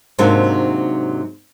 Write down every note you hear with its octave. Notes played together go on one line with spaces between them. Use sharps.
G#2 C3 F#3 A#3 D4 D#4